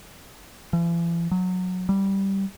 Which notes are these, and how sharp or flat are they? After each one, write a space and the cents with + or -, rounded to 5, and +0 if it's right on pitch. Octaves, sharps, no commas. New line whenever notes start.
E3 +45
F#3 -15
G3 -10